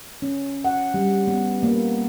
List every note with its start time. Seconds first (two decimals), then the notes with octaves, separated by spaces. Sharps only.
0.22 C#4
0.65 F#5
0.94 G3
1.28 B3
1.63 A#3